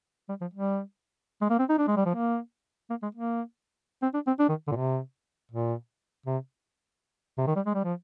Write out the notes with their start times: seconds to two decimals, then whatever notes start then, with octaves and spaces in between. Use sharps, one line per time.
0.29 G3
0.41 F3
0.54 G3
1.41 G#3
1.50 A#3
1.59 C4
1.69 D#4
1.78 D4
1.88 G#3
1.97 G3
2.06 F3
2.15 A#3
2.90 A#3
3.03 G#3
3.15 A#3
4.02 C4
4.14 D4
4.27 C4
4.39 D4
4.49 D#3
4.67 D3
4.71 A#2
4.76 C3
5.52 A#2
6.26 C3
7.38 C3
7.47 D#3
7.56 G3
7.66 G#3
7.74 G3
7.84 F3